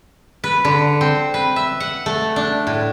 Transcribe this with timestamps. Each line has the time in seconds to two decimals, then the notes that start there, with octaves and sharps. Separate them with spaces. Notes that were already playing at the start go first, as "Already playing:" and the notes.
0.44 B4
0.65 D3
1.01 C4
1.34 B4
1.56 E5
1.80 F#5
2.06 A3
2.36 D4
2.67 A2